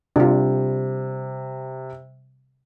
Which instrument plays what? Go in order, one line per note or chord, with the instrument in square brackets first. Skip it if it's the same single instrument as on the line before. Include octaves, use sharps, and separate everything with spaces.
[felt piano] C3 G3 [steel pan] D4 F4